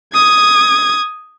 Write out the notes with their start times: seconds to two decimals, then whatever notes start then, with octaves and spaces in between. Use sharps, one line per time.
0.14 D#6 G#6